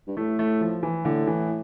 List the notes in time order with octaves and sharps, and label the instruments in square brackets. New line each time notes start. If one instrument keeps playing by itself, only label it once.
[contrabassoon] G2
[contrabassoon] A2 [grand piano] A3
[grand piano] A3
F3
E3
[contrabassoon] A2 [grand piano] D3
[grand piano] E3